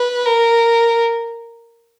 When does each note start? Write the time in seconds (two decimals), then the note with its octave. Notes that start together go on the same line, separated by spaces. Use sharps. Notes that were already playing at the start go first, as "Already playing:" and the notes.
Already playing: B4
0.26 A#4